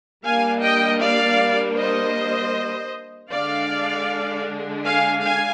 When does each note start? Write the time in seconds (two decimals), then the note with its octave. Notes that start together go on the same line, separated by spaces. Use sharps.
0.24 G3 A#3 D4 F5 G#5
0.62 D#5 G5
1.01 D5 F5
1.78 C5 D#5
3.32 D3 G#3 D4 D5 F5
4.84 F5 G#5
5.23 F5 G#5